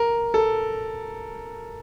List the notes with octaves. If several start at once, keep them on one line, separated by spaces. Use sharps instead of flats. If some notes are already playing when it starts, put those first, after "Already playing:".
Already playing: A#4
A4